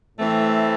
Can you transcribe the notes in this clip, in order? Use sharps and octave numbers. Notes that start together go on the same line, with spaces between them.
A2 E3 A3 C4